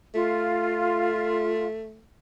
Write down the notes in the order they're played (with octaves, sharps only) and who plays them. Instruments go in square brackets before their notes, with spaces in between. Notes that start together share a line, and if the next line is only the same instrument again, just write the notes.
[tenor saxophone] A3 [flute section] F4